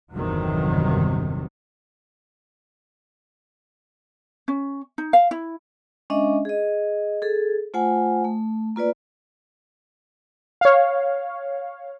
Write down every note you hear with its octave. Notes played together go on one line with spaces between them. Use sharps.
G1 E2 G2 C3 D#3 F#3
C#4
D#4
F5
E4
G#3 C#4 D4 D#5 E5
G#4 D#5
G#4 A4
A3 F4 C5 F#5 G#5
A3
A#3 F4 B4 D5
C#5 F5